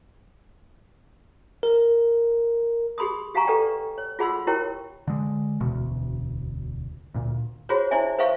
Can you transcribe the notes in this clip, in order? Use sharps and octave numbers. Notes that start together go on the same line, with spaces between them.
A#4
G4 G#4 B5 C6 D#6
G4 F5 F#5 G#5 A#5 C#6
G4 A4 B4 D5 G5
C#5
F4 G#4 F#5 B5 C6 E6
E4 G4 A#4 C#5 G5
D3 G#3
E1 D2 B2
D2 A#2
F4 F#4 G#4 C5 C#5
D#4 E4 C5 D5 E5 G#5
B4 C5 E5 F5 C#6